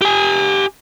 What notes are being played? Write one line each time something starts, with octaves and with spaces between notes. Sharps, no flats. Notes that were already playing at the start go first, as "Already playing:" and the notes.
G4 G#5